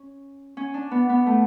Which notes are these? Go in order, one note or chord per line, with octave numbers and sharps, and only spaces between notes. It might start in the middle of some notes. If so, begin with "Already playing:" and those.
Already playing: C#4
C#4
D4
B3
B3
A3